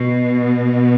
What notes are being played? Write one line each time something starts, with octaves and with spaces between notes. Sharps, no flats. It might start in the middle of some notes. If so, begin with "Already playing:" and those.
Already playing: B2